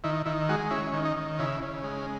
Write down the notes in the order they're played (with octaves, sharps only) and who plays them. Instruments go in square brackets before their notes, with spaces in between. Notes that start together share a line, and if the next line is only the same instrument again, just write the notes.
[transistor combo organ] D#3 E4
D#3 E4
G#3 F#4
C#4 E4
D#3
D#4
D#3
C#3 E4
C#3
G#3